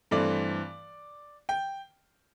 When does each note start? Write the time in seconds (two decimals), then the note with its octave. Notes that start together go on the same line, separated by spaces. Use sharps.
0.11 G2 E3 A3 C4 D5
1.49 G5